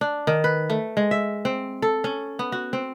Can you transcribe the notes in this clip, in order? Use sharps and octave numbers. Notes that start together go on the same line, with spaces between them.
D4
D#3
B4
A3
G#3
E5
C4
A4
C#4
B3
F#4
C4